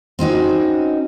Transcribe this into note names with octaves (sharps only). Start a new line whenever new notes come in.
C4 C#4 D#4 F#4